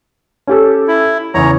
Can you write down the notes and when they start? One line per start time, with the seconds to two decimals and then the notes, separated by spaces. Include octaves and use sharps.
0.47 C#4 G4 A4
0.88 E4
1.34 E2 C#3 C#5 A#5